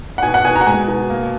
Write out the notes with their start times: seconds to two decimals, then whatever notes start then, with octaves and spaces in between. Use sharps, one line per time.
0.18 F#5
0.23 B2 G#5
0.34 F#5
0.45 B2 G#5
0.56 A#5
0.61 F#5
0.67 G#3 G#5
0.88 B2
1.10 A#3